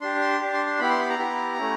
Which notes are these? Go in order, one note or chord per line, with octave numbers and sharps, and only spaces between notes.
D4 G4 C6
C6
D4 G4
C6
C6
B3 E4 G4 B5
C6
B5
A#5
B3 E4 G4
A3 C#4 E4